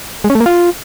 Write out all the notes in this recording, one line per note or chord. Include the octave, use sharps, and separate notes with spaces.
G#3
C#4
A3
A#3
F4